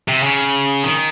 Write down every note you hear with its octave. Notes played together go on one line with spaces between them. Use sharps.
C3
C#3
D#3